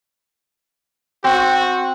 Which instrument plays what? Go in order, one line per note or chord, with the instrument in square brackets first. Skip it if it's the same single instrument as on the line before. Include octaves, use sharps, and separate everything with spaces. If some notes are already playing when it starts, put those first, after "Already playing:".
[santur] C4 [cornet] F#4